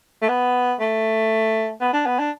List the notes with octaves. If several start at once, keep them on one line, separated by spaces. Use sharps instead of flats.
A3
B3
A3
B3
D4
B3
D4